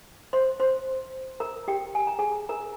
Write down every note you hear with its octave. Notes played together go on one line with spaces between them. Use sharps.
C5 C6
C5 C6
A#4 A#5
G4 G5
G#5
A#5
G#4 G#5
A#4 A#5